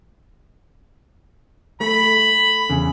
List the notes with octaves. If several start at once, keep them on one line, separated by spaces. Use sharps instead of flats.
A3 B5
E2 C#3